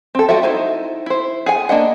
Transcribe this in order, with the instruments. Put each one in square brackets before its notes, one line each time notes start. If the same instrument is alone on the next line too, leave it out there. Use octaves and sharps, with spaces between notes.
[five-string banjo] C4 A4
G3 F4 F#4 A4 E5
D#4 E4 C5
E4 C5
G#4 F#5 G#5
A#3 D4 D#5 F#5